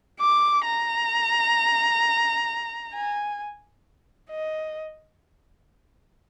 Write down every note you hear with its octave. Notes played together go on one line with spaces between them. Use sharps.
D6
A#5
G#5
D#5